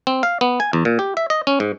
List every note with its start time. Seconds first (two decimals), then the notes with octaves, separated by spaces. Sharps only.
0.07 C4
0.23 F5
0.41 B3
0.60 G#5
0.73 E2
0.85 A#2
0.99 G4
1.17 E5
1.30 D#5
1.47 C#4
1.60 G#2